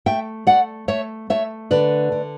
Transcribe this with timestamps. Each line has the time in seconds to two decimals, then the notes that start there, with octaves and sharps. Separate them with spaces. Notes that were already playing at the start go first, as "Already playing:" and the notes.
0.06 A3 E5 G5
0.47 A3 D5 F#5
0.88 A3 C#5 E5
1.30 A3 C#5 E5
1.71 D3 B4 D5
2.12 D3